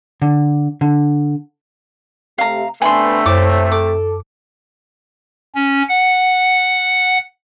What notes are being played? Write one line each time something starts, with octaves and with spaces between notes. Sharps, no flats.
D3
D3
C3 A3 G4 F5 A#5
C3 A3 B3 D4 B4 G#5 B5 C6
F#2 C5 C#5 D6
A4 D6
C#4
F#5